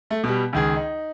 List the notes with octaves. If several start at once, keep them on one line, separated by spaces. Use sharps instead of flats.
A3
B2 G3
C#2 D#3 G#4
D#4